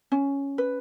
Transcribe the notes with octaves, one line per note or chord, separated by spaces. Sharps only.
C#4
B4